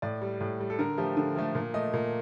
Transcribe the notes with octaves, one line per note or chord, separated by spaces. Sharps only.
A2 D5
G3
A2
G3
A4
D3 A#4
F3 A3 G4
D3
F3 A3
A#2
A3 D#5
A#2